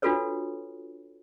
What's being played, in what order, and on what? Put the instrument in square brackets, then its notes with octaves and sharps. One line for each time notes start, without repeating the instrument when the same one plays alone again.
[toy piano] D4 F4 F#4 A4 B4 C#5